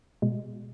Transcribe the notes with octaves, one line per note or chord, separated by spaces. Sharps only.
B2 G#3